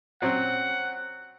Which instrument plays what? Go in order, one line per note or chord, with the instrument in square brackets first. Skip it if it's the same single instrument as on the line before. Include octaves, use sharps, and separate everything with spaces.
[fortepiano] F#3 C4 C#4 [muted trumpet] F#5